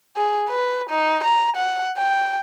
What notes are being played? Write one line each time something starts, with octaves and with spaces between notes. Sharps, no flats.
G#4
B4
D#4
A#5
F#5
G5